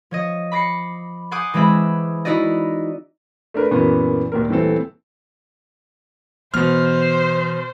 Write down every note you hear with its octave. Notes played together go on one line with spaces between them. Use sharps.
F3 C#5 D#5
B5 D6 A#6 C7 C#7
F#5 G#5 C6 D6 D#6 G6
E3 G#3 C4 G#4 E5 B5
D#4 E4 F#4 D5 D#5
A3 D4 A#4 B4
F#2 A#2 E3 A#3 B3
D#2 A#2 A#4
D#1 E3 A3 C4 A4
B2 E3 B3 C5 F6